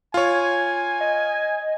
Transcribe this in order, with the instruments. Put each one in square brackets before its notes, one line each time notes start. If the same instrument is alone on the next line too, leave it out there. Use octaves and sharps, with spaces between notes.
[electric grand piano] F4 C#5 [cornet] G#5
[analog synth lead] D#5